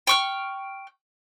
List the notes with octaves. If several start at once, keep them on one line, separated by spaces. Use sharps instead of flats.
G5 C#6 F6